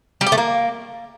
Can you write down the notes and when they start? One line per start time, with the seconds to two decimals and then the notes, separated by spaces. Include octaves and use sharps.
0.21 G3
0.26 G4
0.32 A3
0.38 A#3